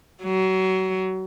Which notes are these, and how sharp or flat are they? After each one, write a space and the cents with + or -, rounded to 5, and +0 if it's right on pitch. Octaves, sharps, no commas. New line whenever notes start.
F#3 +30